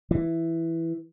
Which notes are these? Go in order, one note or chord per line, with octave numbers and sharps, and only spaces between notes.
E3